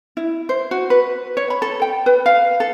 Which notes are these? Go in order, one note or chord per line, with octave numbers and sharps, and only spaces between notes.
E4
C5
F#4
B4
C#5
B5
A4
G5
B4
F5
A4